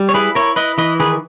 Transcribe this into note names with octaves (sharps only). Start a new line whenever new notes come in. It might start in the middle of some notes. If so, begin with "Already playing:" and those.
Already playing: G3
C#5
E4 G#4 B4
E4 A#4 C#5
E4 B4 D#5
E3 B4 D#5
D#3 G#4 B4